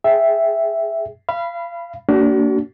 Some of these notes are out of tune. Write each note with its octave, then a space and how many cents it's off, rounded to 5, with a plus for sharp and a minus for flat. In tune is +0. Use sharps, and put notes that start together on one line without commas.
G#4 +0 E5 +0 G5 +0
F5 -30 B5 +0
A#3 -35 D4 -30 F#4 +40